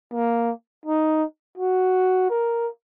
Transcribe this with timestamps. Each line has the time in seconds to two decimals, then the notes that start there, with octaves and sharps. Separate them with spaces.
0.13 A#3
0.86 D#4
1.57 F#4
2.30 A#4